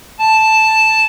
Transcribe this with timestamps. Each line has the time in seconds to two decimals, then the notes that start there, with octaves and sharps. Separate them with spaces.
0.19 A5